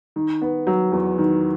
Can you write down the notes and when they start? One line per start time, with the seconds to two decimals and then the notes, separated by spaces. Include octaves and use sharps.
0.16 D#3
0.42 B3
0.67 F#3
0.92 E2
1.18 D#3